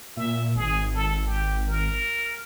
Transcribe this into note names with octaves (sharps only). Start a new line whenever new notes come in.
A#2 E5
G#1 G#4
A4
G4
A#4